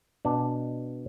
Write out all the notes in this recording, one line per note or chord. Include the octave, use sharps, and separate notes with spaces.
B2 D4